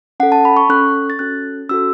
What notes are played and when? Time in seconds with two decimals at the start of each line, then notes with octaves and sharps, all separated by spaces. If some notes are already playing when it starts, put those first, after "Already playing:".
0.20 C#4 A4 F#5
0.32 A5
0.45 B5
0.57 C#6
0.69 C#4 A4 F#6
1.10 A6
1.19 C#4 F#4 A4 F#6
1.69 C#4 F#4 A4 E6